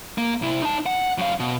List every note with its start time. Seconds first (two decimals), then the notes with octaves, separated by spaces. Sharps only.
0.18 A#3
0.42 C3 E4
0.62 D#4 A5
0.86 F#5
1.18 F#2 F5
1.40 B2